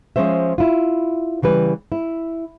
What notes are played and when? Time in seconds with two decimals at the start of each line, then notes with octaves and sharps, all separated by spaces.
0.16 F3 G#3 C#4 C5 E5
0.58 E4 F4
1.42 C#3 E3 G3 B4
1.92 E4